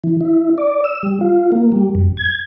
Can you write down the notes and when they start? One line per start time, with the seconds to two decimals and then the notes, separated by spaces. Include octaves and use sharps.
0.04 E3
0.21 E4
0.58 D5
0.84 E6
1.03 G3
1.21 F4
1.52 A#3
1.72 G3
1.95 F#2
2.17 G#6